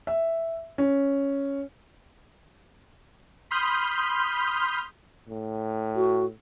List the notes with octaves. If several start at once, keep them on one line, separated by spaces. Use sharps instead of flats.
E5
C#4
B5 C6 D#6 F6 G6 B6
A2
F#4